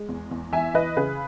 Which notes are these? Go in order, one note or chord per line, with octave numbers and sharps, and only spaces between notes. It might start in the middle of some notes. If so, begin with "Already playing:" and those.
Already playing: G#3
E2
E2
E3 E5 G#5
E3 B4 D#5
C#3 G#4 B4